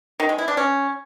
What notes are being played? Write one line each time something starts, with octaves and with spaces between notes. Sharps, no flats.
D#3
G#3
E4
D4
C#4